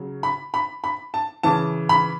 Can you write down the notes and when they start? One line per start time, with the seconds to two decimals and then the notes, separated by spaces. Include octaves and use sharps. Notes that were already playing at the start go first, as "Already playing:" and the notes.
Already playing: C#3 F#3
0.23 B5
0.54 B5
0.84 B5
1.14 A5
1.43 C#3 E3 A5
1.89 B5